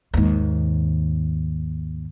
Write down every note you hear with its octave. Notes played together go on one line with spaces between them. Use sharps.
D#2 G#2